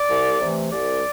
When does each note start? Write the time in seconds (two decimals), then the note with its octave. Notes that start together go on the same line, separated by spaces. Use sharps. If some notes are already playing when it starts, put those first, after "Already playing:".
Already playing: D5
0.09 C2
0.40 C3 E3 A3
0.71 C2 D5